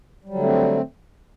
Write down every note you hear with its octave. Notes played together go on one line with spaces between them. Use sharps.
D3 F#3 G3 A3 C4